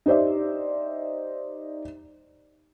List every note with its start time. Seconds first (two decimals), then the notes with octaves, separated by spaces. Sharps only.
0.06 D#4 G4 C5 D5 E5